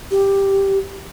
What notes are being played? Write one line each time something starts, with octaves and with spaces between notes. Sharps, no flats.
G4